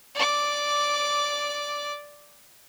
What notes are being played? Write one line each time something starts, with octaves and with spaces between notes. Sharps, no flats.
D5 D6